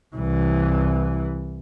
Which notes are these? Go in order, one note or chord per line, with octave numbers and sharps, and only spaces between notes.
C2 E3